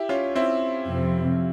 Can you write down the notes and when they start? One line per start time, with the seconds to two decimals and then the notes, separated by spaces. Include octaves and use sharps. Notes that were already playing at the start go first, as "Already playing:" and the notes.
Already playing: E4 G4
0.09 C#4 F4
0.35 C4 E4
0.89 F2 C3 F3